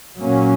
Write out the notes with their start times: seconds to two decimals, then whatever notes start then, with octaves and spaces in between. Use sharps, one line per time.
0.18 A#2 F#3 A#3 C#4